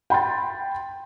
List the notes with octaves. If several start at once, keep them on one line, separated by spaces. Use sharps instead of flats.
G5 B5 C6 A6